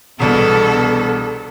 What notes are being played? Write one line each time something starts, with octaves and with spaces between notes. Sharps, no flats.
E1 C2 B2 B3 A4